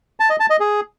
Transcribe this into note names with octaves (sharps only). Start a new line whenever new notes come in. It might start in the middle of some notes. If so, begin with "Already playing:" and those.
A5
D#5
A5
D#5
G#4